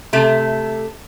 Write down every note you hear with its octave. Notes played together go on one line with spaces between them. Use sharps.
C3 A3